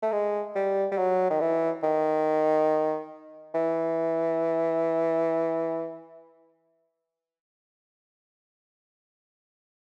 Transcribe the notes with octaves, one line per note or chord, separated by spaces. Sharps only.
A3
G#3
G3
G3
F#3
D#3
E3
D#3
E3